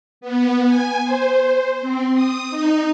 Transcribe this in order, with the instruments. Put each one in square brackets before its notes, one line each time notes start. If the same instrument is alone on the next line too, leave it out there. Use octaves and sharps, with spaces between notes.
[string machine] B3
G#5
C5
C4
D#6
D#4